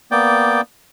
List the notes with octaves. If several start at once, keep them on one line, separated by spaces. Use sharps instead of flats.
A#3 B3 D5 G5